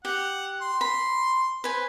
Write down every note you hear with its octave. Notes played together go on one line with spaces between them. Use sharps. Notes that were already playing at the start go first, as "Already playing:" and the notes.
G4 F#5
C6
B5
B4 C5 G#5